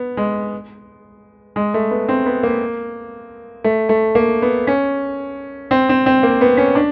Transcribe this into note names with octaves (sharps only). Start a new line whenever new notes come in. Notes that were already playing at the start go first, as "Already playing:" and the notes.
Already playing: B3
G#3
G#3
A3
B3
C4
B3
A#3
A3
A3
A#3
B3
C#4
C4
C4
C4
A#3
B3
C#4
D4